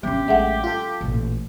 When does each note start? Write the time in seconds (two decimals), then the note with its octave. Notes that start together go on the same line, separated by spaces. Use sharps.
0.03 F#3 B3 C#4 D4 G4
0.28 A1 G#3 A3 E5 F#5
0.64 F4 A4
1.01 A1 A#2